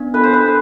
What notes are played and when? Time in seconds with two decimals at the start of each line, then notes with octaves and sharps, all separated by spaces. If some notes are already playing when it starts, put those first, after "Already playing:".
Already playing: B3 D4
0.14 A4 B4
0.24 C5
0.34 B4